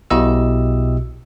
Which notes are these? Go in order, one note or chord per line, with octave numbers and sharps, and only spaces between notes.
B1 B2 E4 G4 D#5 E6